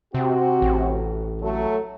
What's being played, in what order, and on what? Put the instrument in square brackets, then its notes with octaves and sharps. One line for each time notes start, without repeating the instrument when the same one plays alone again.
[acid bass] C3 [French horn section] C4 F#4 G4
[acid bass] A1
[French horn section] F#3 A3 A4